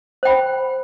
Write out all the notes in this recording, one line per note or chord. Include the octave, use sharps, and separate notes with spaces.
C5 G5 B5